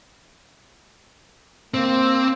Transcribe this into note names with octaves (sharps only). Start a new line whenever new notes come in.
A#3 C4